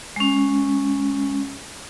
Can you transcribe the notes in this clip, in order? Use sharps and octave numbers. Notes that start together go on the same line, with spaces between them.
G#3 C#4